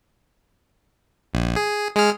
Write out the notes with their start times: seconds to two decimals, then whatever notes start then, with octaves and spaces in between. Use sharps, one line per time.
1.34 A#1
1.56 G#4
1.96 G#3 G#4 F6